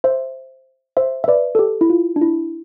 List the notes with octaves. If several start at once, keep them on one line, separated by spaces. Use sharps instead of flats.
C5 E5
C5 E5
E5
B4 D5
A4
G4
E4
F4
D4
E4